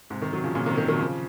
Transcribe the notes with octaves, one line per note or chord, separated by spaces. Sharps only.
G#2 C3
C3 D#3
D#3 F#3
C#3 F3
A#2 C#3
C3 D#3
C3 D#3
D#3 F#3
C#3 F3